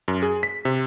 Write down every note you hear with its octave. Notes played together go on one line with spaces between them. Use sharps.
F#2
G#4
B6
C3